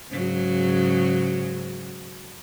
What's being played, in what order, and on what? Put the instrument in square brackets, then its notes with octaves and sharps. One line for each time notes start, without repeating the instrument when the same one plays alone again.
[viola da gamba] G#2 C#3 F#3